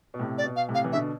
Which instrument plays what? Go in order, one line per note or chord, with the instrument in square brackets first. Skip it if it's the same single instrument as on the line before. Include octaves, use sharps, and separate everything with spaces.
[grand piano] B2
A2 C3
[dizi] D5
[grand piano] B2
[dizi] F5
[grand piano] A2 C3
[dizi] F5
[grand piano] E3
[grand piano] B2 D3 [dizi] E5